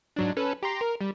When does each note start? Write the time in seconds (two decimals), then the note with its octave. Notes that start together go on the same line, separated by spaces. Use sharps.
0.16 G#2 F#3 D4
0.37 C#4 A4 B4
0.63 G4 A#5 C6
0.81 A#4
1.01 G3